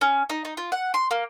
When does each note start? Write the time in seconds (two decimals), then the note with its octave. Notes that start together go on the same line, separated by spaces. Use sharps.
0.01 C#4
0.30 D#4
0.45 D#4
0.57 F4
0.72 F#5
0.94 C6
1.11 A#3